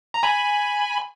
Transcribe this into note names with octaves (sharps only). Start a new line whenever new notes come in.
A#5
G#5 B5